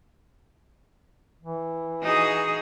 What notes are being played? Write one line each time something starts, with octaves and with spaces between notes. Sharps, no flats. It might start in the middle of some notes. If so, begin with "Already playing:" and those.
E3
D#4 F#4 G#4